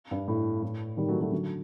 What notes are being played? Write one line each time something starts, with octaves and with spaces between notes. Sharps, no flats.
G2
A2
A2
D#3 G3
F#3 A3
F#3 A3
D3 F#3